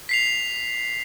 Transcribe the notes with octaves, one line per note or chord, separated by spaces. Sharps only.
B6 C7 F7